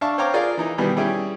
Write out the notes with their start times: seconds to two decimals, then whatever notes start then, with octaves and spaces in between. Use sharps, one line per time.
0.01 D4 E5 F5 A5 C#6
0.18 C5 C#5 F5 G5 A#5 D6
0.33 F4 G#4 A#4 D5 F5
0.57 E3 D#4
0.78 B2 D#3 E3 G3 B3
0.97 G3 C#4 E4 G#4 G5